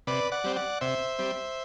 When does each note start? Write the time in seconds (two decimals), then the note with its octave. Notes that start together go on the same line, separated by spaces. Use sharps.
0.07 C3 B4 D5
0.32 D5 F#5
0.44 G3 C4
0.56 D5 F#5
0.81 C3 C5 E5
1.19 G3 C4